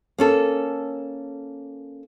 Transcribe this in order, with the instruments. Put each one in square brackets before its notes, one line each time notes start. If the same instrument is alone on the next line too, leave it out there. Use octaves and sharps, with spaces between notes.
[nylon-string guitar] A#3 C#4 A4